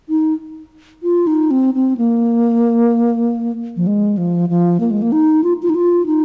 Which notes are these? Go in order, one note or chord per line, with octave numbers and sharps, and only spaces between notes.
D#4
F4
D#4
C4
C4
A#3
F3
G#3
F3
F3
A#3
G#3
A#3
D#4
F4
F4
D#4
F4
D#4